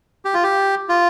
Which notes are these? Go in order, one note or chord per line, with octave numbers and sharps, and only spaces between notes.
G4
F4
G4
F4